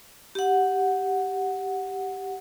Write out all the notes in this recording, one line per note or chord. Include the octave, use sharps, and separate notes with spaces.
G4 F#5